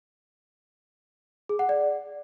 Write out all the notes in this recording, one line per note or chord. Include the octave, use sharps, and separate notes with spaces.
G#4
F#5
D5